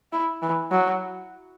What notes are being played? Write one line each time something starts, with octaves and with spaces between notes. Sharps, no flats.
E4
E3
F#3